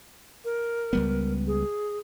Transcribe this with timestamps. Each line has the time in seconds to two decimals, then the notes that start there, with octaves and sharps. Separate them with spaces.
0.45 A#4
0.93 C#2 G3 B3
1.47 G#4